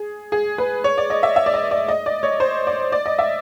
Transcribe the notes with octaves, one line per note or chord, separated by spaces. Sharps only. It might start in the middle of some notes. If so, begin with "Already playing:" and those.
Already playing: G#4
G#4
B4
C#5
D5
D#5
E5
E5
D5
D#5
D5
D#5
D5
C#5
C5
D5
D5
D#5
E5